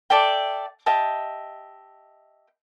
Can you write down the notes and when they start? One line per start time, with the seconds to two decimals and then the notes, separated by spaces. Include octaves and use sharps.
0.10 A4 D5 E5 G5
0.86 G4 D#5 E5 A5